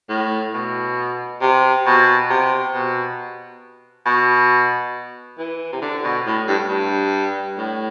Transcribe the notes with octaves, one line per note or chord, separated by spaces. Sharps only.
A2
B2
C3
B2
C3
B2
B2
E3
C3
D3
B2
A2
G2
G2
A2